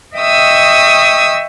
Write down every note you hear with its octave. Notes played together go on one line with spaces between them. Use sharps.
D#5 E5 G5 C#6 D#6 E6